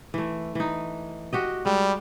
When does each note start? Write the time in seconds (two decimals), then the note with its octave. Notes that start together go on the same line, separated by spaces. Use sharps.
0.14 E3 A3
0.55 E3 D#4
1.33 F#4 G4 D#5
1.66 G3 G#3